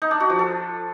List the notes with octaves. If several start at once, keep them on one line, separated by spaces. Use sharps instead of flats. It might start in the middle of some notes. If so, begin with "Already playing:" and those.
D#4
D4
F#4
F3
A4